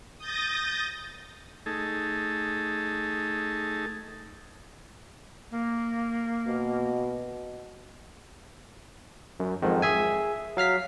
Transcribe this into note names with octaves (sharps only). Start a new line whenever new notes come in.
D#6 G6 A6 A#6
A3 D#4 G#4 A4
A#3
B2
F#2
F2 G#2 D#3
G#4 E5 G#5
F#3 F5 F6 B6